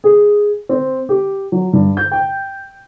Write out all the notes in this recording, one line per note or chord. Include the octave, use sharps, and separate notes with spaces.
G#4
C4
G4
F#3
G2
G6
G5